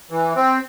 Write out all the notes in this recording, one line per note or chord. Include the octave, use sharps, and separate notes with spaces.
E3
C4